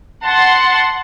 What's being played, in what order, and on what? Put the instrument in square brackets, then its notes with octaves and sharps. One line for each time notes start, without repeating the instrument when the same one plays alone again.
[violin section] F#5 C6 [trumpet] A5